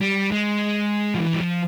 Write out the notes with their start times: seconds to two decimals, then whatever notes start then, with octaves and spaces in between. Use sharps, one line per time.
0.01 G3
0.32 G#3
1.15 F3
1.20 E3
1.34 G3
1.41 F3